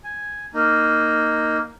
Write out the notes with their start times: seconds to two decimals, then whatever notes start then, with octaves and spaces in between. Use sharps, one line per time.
0.04 G#5
0.54 A#3 D#4